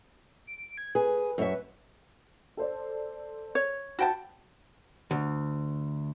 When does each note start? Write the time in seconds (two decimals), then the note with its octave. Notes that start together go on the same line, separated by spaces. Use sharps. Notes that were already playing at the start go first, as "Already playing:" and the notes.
0.47 D7
0.77 G#6
0.95 G#4 B4
1.38 F#2 C#5 E5
2.57 A4 C5 D5
3.55 C#5
3.99 F#4 F#5 G5 A5 B5
5.11 D2